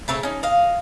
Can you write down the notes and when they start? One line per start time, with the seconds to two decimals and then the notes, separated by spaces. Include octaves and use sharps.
0.08 C#3 A3 C4 C#5
0.23 C#4 D#4
0.43 D#5 F5